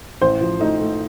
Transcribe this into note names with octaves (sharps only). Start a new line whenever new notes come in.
A1 C5
F3
A3 D#4
A3